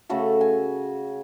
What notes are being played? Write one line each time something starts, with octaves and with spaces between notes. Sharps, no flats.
C#3 A3 F#4 A4
G#5